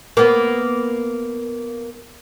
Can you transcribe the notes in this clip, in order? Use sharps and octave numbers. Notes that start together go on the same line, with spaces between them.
A#3 B3